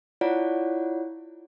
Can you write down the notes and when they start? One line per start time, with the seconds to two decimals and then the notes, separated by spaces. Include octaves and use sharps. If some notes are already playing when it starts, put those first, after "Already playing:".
0.21 E4 F4 C#5 D5 F#5